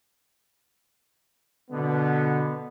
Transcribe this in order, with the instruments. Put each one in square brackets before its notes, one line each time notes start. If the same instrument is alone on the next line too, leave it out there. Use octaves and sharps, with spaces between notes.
[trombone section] B2 D3 B3